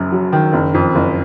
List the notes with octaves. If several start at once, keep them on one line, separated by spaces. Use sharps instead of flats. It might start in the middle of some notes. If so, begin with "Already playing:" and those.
Already playing: F#1 F#2
F#3
D#3
F#1
F2
F#1